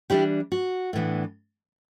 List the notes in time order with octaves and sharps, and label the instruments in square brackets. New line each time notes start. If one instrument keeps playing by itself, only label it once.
[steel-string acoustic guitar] E3 G3 D4 E4 G4
F#4
A2 E3 B3 D4